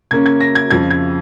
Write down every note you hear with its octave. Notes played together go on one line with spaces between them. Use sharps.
C#3 A#3 C#4 G#6
G#6
A#6
G#6
F2 C#3 F3 G#6
G#6